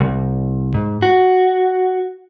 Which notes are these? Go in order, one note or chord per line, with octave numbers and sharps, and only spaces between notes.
C2
G#2
F#4